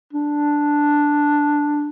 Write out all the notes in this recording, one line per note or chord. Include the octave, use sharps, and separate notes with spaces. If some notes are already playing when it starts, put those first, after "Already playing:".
D4